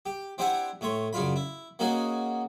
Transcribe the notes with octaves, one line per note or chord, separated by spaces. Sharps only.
G4
C4 D4 E4 G4 F#5 G#5
A2 A3 C#5 C6
F#2 C#3 D4 F4 B5
E4
A#3 C#4 D#4 F#4 G#4